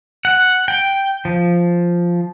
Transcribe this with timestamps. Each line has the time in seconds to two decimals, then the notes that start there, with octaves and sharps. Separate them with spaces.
0.25 F#5
0.68 G5
1.25 F3